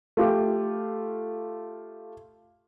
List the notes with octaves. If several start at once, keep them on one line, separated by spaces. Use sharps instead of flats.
A3 F4 G4